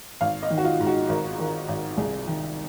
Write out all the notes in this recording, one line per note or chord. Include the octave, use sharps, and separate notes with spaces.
G#1 F5
D#5
D#3
F#4
F4
G#2
F#4
G#1 A#4
D#3 A#4
G#1
C2 G#4
D#3